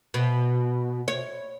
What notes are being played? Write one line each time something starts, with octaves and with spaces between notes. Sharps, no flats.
B2
C#5